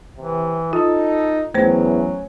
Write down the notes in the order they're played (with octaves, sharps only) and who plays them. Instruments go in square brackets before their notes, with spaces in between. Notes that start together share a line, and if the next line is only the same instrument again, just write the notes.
[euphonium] C3 [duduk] E3
[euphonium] D#4 [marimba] F4 [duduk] A4
[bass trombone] E2 [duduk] F#3 [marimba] A3 C5 [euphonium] C#4